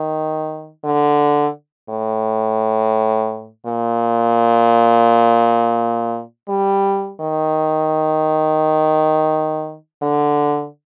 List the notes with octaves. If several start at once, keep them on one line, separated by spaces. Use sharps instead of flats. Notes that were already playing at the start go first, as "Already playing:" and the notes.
Already playing: D#3
D3
A2
A#2
G3
D#3
D3